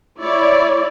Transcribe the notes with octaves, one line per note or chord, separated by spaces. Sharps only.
E4 C#5 D5